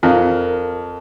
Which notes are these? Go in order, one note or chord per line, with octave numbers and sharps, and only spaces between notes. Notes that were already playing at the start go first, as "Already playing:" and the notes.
F2 C4 A#4